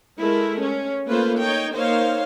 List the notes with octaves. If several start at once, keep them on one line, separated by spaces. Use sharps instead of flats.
G#3 A3 E4 A#4
C#4
A3 A#3 F4 B4 C5
D#4 C#5 G5
A#3 D#4 C5 C#5 F5